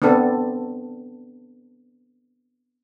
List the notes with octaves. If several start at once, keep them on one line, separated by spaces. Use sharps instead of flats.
B3 C4 D4 A4